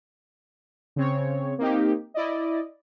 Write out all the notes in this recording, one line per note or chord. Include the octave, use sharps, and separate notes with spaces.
C#3 C4 C#5
A#3 C4 D#4 G4
E4 D5 D#5